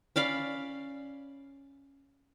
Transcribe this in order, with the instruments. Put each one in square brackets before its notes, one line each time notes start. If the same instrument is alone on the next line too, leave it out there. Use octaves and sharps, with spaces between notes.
[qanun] C#4 D5 F5 B5